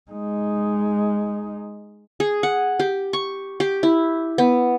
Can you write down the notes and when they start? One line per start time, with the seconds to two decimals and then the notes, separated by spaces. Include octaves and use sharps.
0.11 G#3 D#4
2.20 G#4
2.43 F#5
2.79 G4
3.13 C#6
3.60 G4
3.83 E4
4.38 B3